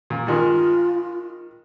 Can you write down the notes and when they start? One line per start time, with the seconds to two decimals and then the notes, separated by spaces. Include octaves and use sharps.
0.10 A#2
0.27 G2 D#3 G#3 F4